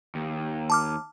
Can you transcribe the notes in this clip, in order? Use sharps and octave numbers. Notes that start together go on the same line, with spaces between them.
D#2
A5 D6 F6